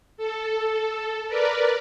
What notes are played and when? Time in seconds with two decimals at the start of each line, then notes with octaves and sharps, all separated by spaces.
0.17 A4
1.28 A#4 B4 D5